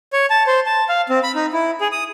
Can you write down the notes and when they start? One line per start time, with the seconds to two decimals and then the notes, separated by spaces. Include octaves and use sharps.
0.13 C#5
0.30 A5
0.47 C5
0.66 A5
0.89 F5
1.09 C4
1.23 B5
1.35 D#4
1.53 E4
1.81 G#4
1.92 D#6